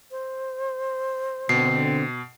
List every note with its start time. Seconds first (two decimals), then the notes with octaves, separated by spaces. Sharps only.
0.11 C5
1.49 B2 D3 C4 C7